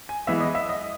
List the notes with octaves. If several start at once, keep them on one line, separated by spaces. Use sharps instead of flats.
G#5
E3 G#3 B3 E5
D#5
E5
D#5